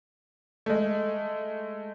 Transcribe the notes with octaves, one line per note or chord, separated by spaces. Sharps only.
G#3 A3